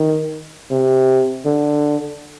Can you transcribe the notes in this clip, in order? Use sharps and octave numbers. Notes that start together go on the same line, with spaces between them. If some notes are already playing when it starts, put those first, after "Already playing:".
Already playing: D#3
C3
D3